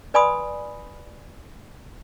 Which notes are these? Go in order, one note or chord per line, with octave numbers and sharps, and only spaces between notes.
B4 D5 G#5 B5 C6 D#6